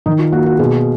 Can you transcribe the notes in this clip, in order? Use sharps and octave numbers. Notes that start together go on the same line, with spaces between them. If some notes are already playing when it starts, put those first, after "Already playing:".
D#3 D#4
F4
A#3 F#4
F#4
B2 G#4